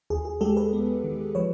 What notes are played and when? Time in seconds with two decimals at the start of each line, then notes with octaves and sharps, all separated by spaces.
0.10 D#2 G#4
0.25 G#4
0.41 G#3 G4 A4
0.57 A4 B4
0.73 B3
1.04 D#3
1.35 F3 B4 C#5